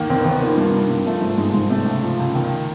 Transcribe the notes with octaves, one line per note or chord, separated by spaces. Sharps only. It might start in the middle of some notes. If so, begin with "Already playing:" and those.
Already playing: D#2 D#3 A#3
D#3 C4
B3
D#3
B3
F3 A#3
G2
G2
G2
F3 A3
G#2
G#2 G#3
G#2
C3 A3
C#2
F3
C#2
D#3